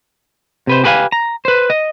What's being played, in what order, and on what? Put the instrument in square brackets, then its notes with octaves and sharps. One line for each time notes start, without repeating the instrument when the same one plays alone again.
[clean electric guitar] C3 B4 C5
G4 G#4 B4 C5 F5 G#5
A#5
B4 C5
D#5